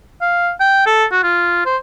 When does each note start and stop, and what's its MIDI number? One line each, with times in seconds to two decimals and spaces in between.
0.21 0.51 77
0.60 0.86 79
0.86 1.05 69
1.12 1.21 66
1.23 1.65 65
1.66 1.77 72